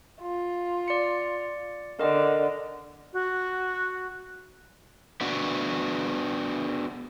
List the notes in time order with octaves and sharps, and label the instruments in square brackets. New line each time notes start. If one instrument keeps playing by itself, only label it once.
[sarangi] F4
[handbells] D5 C#7
[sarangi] D3 [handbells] A#4 D#5
[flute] F#4
[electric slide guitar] B3 D4 F#4